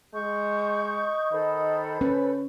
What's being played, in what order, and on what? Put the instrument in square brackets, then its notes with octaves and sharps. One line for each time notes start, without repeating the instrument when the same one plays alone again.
[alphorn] G#3 [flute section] C#6 G6
[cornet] D#5
[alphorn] D#3 [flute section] A4 C5 B5
[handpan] C#4 [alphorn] B4